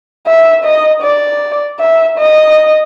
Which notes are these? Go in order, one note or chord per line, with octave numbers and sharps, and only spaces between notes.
E5
D#5
D5
E5
D#5